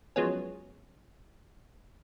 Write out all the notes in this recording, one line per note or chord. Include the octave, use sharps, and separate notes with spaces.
F3 F#3 G#3 B3 C#4